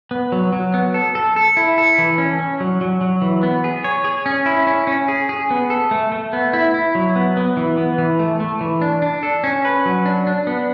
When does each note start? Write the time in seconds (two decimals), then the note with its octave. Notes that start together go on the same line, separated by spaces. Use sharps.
0.11 B3
0.32 F#3
0.53 F#3
0.74 B3
0.94 A4
1.15 A4
1.36 A4
1.57 E4
1.78 A4
1.98 E3
2.18 C#4
2.39 C#4
2.60 F#3
2.81 F#3
3.01 F#3
3.22 E3
3.43 B3
3.64 G#4
3.84 C#5
4.04 G#4
4.26 C#4
4.46 E4
4.67 C#4
4.87 C#4
5.08 G#4
5.29 G#4
5.51 B3
5.70 A4
5.91 A3
6.12 A3
6.33 B3
6.53 E4
6.74 E4
6.95 F#3
7.16 B3
7.37 B3
7.57 E3
7.77 B3
7.98 E3
8.19 A3
8.40 A3
8.61 E3
8.82 D4
9.02 D4
9.23 A4
9.44 C#4
9.65 B4
9.85 F#3
10.06 D4
10.27 D4
10.47 B3